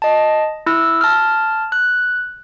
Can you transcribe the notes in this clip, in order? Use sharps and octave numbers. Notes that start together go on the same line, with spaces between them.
D#5 A5
E4 E6
A5 F6
F#6